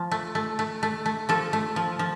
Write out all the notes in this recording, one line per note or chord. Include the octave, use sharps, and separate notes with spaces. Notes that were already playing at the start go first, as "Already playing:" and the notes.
Already playing: F3
A3
A3
A3
A3
A3
F3 A4
A3
F3
F3